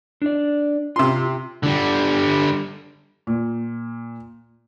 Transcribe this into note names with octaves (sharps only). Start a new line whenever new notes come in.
D4 D5
C3 F4 C6
D3 G3
A#2